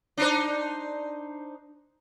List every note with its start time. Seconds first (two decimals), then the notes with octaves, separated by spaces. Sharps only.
0.17 D4 D#4 C5